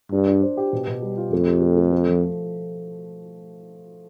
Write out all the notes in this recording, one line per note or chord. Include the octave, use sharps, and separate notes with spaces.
G2 D4
D4
C5
G4
B2
B2
G3
F4
F2 A3
G4
A3
A3
A3
F3